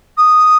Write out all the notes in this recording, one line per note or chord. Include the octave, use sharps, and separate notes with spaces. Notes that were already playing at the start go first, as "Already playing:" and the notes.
D#6